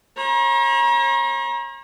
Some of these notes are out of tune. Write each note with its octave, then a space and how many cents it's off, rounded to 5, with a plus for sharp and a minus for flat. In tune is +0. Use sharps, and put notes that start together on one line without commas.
C#5 -40 A#5 +35